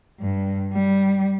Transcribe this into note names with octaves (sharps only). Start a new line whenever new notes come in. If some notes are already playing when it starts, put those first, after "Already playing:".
G2
G3